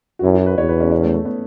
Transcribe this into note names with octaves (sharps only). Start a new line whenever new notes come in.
F#4
F#2 E4
F#4
B4
E2 C#5
B4
C#4
C#4
A3
A3
B3